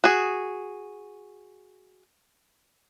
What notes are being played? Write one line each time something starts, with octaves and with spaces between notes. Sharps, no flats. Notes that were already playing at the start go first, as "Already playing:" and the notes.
F#4 G#4